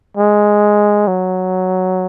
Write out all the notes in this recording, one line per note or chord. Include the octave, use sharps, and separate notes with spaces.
G#3
F#3